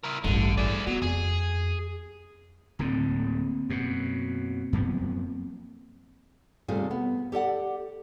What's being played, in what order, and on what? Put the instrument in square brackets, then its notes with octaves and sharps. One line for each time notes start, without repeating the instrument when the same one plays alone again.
[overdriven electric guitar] E4 A#4
[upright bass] A1 G2 [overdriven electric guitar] D3
[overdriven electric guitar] G#4 D5
[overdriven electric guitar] F#3 [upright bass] B3
[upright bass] F2 [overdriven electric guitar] G#4
[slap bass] D1 A2 D3 [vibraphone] A#3 C4
[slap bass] F#2 B2
F#2 F3 B3
[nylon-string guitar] D#2 C3 G3 A3 F4 G#4
B3
G4 A4 D5 F#5